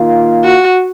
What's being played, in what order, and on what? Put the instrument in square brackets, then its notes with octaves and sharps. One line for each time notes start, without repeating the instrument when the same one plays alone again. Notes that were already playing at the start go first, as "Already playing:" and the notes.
Already playing: [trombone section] D#3 A#3 F4
[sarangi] F#4